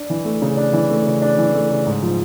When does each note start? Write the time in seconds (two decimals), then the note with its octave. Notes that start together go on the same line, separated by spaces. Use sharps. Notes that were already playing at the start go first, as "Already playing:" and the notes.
Already playing: D4
0.10 E3
0.25 A3
0.42 C#3
0.57 D4
0.73 E3
0.90 A3
1.06 C#3
1.22 D4
1.38 E3
1.54 A3
1.71 C#3
1.86 G#2
2.03 F3